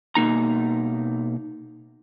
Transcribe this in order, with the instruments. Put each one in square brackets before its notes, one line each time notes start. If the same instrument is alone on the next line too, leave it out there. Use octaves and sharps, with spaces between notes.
[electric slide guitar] B2 A#3 D#4 A#5